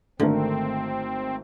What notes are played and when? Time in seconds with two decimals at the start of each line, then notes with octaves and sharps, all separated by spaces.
0.20 G#1 D3 A3 C4 A#4